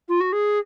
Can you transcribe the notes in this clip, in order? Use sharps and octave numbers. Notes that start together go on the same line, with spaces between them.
F4
F#4
G#4